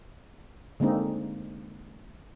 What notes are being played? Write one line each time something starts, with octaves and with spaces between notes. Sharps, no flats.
D3 G#3 A#3 C4 D#4